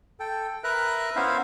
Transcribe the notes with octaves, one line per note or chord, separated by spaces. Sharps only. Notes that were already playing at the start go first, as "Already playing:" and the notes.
A4 G5
A#4 B4 E5 A#5 F#6
B3 C#4 E4 C5 E5 F5